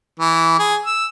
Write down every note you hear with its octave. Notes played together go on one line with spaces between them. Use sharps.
E3
G#4
E6